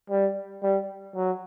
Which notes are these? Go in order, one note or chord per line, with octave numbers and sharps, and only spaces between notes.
G3
G3
F#3